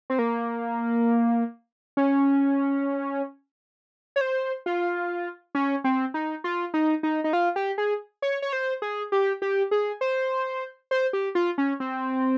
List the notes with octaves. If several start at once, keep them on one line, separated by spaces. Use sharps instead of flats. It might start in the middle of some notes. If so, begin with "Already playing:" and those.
C4
A#3
C#4
C#5
C5
F4
C#4
C4
D#4
F4
D#4
D#4
D#4
F4
G4
G#4
C#5
C#5
C5
G#4
G4
G4
G#4
C5
C5
G4
F4
C#4
C4